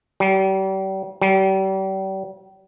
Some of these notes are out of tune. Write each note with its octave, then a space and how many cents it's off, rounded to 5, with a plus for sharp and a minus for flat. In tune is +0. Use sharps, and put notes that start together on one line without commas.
G3 -35
G3 -35